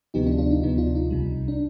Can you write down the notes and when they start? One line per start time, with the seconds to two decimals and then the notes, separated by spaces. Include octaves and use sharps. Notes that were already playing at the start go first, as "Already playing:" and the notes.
0.14 D2 C3 F3 B3 D#4 G4
0.27 D4 F4
0.38 D4 F4
0.51 D#4
0.62 D2 C3 F3 B3 D#4
0.78 D4 F4
0.95 D#4
1.10 C2 C3 G3
1.48 D4